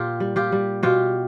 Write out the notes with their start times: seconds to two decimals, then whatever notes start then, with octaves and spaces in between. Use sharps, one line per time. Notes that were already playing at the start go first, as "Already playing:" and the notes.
Already playing: A#2 F4 G4
0.20 G3
0.36 F4 G4
0.52 G3
0.83 B2 F4 G4